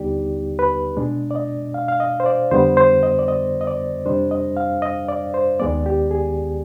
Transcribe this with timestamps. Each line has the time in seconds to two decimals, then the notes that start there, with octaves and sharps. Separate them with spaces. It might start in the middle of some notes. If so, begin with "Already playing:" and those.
Already playing: D#2 D3 G3 B3 D#4 G4 D5
0.59 B4
0.97 B2 G#3 D4
1.31 D5
1.36 D#5
1.74 F5
1.88 F5
2.00 D#5
2.20 C5
2.26 D5
2.51 F2 D3 G3 B3 C5
2.77 C5
3.03 D#5
3.19 D5
3.28 D#5
3.61 D#5
3.67 D5
4.06 F2 C3 G3 D4 C5
4.31 D#5
4.57 F5
4.82 D#5
5.08 D5
5.34 C5
5.60 D#2 D#3 G#3 B3 D5
5.86 G4
6.11 G#4